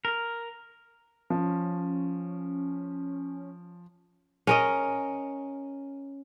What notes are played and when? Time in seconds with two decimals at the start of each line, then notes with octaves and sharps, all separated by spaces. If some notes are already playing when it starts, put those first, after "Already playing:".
0.05 A#4
1.30 F3 C#4
4.47 C#4 A#4 D#5